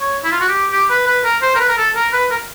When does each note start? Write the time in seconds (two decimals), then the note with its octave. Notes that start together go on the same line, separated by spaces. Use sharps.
0.01 C#5
0.24 E4
0.32 F4
0.41 F#4
0.49 G4
0.72 G4
0.90 B4
1.07 B4
1.24 A#4
1.42 C5
1.55 A#4
1.60 B4
1.69 A#4
1.78 A4
1.96 A#4
2.13 B4
2.31 A#4